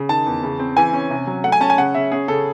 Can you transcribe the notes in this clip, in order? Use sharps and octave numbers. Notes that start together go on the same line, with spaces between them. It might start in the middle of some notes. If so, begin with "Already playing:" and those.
Already playing: C#3
D#3 A5
E2
C#3
C4
E3 G#5
C#4
C3
F#3
A3 F#5
G#5
C#4 A5
G#5
C#3 F#5
C#3 E5
C#4 G#4
C#3 A4